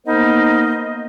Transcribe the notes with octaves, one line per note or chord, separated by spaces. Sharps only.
A#3 B3 D#4 A#4 C5 D#5